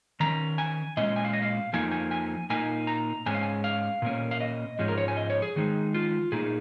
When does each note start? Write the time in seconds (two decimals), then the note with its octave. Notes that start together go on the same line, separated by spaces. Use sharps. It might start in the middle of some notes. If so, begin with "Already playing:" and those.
0.20 D#3 C#4 A#5
0.58 G#5
0.97 A#2 G#3 C#4 D#5
1.16 G#5
1.25 F5
1.33 D#5
1.42 F5
1.73 F2 F3 A#3 D#4 G#5
1.91 G#5
2.11 G#5
2.50 A#2 A#3 D#4 G#5
2.87 A#5
3.26 G#2 G#3 C#4 G#5
3.34 F5
3.43 G#5
3.64 F5
4.02 A#2 A#3 C#4
4.31 F5
4.40 D#5
4.79 G#2 F3 G#3 C#4
4.88 A#4
4.98 C#5
5.08 G#5
5.17 D#5
5.30 C#5
5.42 G#4
5.56 D#3 G#3 D#4
5.94 F4
6.32 A#2 A#3 D#4 G#4